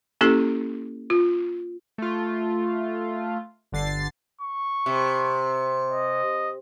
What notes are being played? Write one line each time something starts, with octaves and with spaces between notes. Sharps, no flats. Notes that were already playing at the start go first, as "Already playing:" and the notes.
A#3 C#4 E4 G4 A4
F4
A3 F4
G1 D3 A6 C7
C#6
C3
D#5